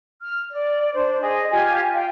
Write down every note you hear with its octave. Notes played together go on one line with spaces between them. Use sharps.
F6
D5
D4 C5
G#4 D#5
F4 G4 G#5
F5 G5